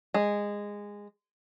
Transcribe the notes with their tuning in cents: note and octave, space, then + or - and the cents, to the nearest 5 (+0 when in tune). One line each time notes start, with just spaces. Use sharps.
G#3 -15